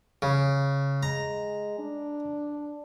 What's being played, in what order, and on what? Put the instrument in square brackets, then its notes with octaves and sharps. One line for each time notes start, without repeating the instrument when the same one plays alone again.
[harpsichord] C#3
[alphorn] G#3 [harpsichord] A#5
[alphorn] D4